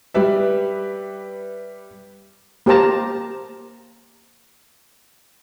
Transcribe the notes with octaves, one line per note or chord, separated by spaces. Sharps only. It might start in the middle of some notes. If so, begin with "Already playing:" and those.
G3 G4 B4 E5
A#3 G4 C5 A5 A#5